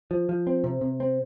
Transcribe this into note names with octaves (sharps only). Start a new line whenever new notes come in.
F3
F3
C4
C3
C3
C4